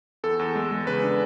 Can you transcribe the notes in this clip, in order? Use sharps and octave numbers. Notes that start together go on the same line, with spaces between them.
E2 A4
E2
G#3
G#3
C#3 B4
D4